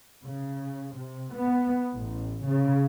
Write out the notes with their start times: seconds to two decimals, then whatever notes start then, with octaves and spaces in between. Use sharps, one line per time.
0.24 C#3
0.97 C3
1.35 B3
1.97 A1
2.46 C#3